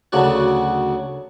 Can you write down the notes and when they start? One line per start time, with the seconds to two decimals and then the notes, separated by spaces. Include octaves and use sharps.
0.12 D2 C#3 F#3 D4 F#4 F#5